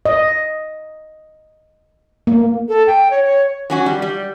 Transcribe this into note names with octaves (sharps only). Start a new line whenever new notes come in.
D#5
A#3
A4
G5
C#5
C#5
F#3 C#4 F#4
G3
G3